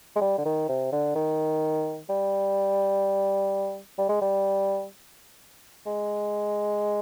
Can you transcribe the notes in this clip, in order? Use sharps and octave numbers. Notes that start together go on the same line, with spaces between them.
G#3
G3
D3
D#3
C3
D3
D#3
G3
G3
G#3
G3
G#3